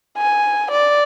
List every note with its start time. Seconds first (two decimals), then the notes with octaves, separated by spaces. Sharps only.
0.18 G#5
0.71 D5